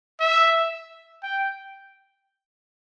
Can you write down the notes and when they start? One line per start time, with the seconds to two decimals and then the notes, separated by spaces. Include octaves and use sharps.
0.20 E5
1.23 G5